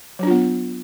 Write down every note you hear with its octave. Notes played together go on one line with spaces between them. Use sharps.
F#3 B3 D4 F4